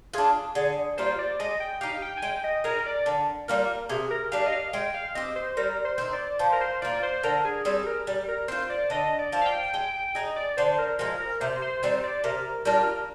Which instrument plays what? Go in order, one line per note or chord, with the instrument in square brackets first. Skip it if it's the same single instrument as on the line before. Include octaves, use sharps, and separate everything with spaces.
[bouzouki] D4 F4 [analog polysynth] G#4
[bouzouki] D3 [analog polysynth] G#4
[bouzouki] G3 A#3 F4 [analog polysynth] C5
[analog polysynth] D5
[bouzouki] G#3 [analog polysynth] D#5
[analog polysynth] G5
[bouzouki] D#4 G4 [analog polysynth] F5
[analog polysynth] G5
G#5
[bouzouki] G#3 [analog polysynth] G5
[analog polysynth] D#5
[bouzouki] D#4 G#4 [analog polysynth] A#4
[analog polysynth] D5
[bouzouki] D3
[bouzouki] G3 A#3 F4 [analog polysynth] A#4
[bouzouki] C3 [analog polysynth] G#4
[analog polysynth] A#4
[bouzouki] G3 D4 [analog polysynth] F5
[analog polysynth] D#5
F5
[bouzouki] G#3 [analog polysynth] G5
[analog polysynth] F5
[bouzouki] C4 G4 [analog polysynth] D#5
[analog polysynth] C5
[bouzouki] G3 [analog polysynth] A#4
[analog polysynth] C5
[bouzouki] C4 D#4
[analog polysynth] D5
[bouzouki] F3 [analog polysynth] C5
[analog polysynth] A#4
C5
[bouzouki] A#3 F4 [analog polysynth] D5
[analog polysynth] C5
[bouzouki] D3 [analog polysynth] A#4
[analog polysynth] G#4
[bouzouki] G3 C4 [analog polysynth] G#4
[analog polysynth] A#4
[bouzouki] G3
[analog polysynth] A#4
[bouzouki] C4 F4 [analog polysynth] C5
[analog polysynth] D5
[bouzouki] D3 [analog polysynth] D#5
[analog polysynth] D5
[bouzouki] F3 C4
[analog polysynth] F5
G5
[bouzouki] G#3 [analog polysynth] G5
[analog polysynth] G5
[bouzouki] D#4 G#4 [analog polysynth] D#5
[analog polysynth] D5
[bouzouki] D3 [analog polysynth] C5
[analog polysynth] A#4
[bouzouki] F3 G#3 [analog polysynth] A#4
[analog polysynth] A#4
[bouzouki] C3 [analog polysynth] C5
[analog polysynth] C5
[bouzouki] D#3 G3 C4 [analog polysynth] C5
[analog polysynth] D5
[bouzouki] C3 [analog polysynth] A#4
[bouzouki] G3 D4 F4 [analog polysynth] A#4